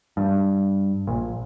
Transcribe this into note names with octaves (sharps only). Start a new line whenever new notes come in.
G2
A#1